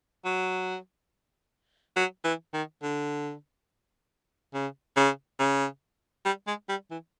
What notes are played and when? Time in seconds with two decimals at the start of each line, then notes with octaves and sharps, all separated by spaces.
0.25 F#3
1.96 F#3
2.24 E3
2.53 D#3
2.83 D3
4.54 C#3
4.96 C#3
5.39 C#3
6.25 G3
6.47 G#3
6.69 G3
6.91 E3